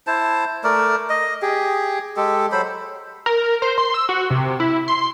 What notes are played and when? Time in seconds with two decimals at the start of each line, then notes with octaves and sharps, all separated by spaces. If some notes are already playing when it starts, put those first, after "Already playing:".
0.07 E4 C5 A5
0.64 A3 A#4 D5
1.10 D#5
1.42 G4 G#4
2.17 G#3 G4 A4
2.52 F#3 A4 C5 B5
3.26 A#4
3.62 C5
3.78 C6
3.94 E6
4.09 F#4
4.30 C3
4.60 E4
4.88 C6